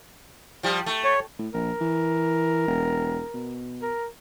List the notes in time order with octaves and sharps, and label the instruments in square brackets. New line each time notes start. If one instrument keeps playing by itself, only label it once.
[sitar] F3 G3
A3
[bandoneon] C#5
[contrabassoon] A2
[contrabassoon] A#1 [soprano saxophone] A#4
[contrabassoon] E3
E1
B2
[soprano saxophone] A#4